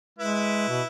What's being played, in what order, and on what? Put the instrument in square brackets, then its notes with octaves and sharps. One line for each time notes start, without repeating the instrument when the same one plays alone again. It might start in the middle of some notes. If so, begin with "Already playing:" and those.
[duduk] G#3 [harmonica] E4 B4
[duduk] B2